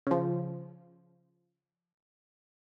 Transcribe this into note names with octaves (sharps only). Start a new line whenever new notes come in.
C#3 F3